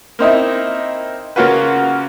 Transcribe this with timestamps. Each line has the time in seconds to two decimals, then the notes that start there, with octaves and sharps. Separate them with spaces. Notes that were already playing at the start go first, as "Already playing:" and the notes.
0.19 A#3 C4 D#4 E4
1.36 C#3 A#3 C#4 F4 F#4 B4